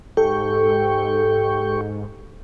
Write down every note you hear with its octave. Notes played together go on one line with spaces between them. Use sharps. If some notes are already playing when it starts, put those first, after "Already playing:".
G#2 G4 A4 G5 C#6